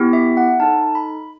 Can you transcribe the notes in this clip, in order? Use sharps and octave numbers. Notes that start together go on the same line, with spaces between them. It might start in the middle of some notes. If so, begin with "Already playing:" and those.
Already playing: B3 E4 G4
E5
F#5
D#4 A4 A5
B5